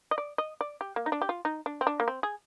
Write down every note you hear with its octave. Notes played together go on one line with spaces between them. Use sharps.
D#5
D5
D#5
D5
G4
A#3
D#4
D4
G4
F4
D#4
D4
C4
D4
A#3
C4
G#4